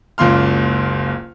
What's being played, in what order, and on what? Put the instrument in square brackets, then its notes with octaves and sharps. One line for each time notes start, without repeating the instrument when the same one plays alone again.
[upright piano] F#1 C#2 A#3 C6 F6